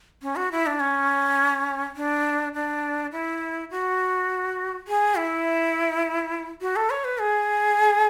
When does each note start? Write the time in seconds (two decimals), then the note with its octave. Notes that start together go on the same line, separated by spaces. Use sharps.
0.22 C#4
0.36 F#4
0.52 E4
0.66 D4
0.80 C#4
1.96 D4
2.54 D4
3.12 E4
3.71 F#4
4.88 G#4
5.16 E4
6.61 F#4
6.76 A4
6.90 C#5
7.04 B4
7.20 G#4